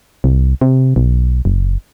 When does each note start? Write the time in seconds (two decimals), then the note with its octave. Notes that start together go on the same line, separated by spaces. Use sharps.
0.24 C2
0.61 C3
0.96 B1
1.45 F#1